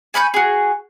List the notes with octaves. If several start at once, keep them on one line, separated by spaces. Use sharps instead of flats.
G#5 B5 C#6 G6
F#4 G#4